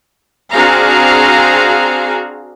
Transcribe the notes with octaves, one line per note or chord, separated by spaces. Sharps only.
C4 D4 F#4 G#4 F5 A#5